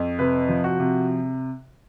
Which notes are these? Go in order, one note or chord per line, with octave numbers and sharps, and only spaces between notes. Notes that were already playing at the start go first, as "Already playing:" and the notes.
Already playing: F2
C3 B4
F3
F#4
C3